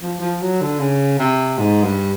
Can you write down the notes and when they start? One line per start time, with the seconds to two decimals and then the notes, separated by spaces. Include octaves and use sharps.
0.02 F3
0.21 F3
0.41 F#3
0.61 D3
0.80 C#3
1.19 C3
1.58 G#2
1.84 G2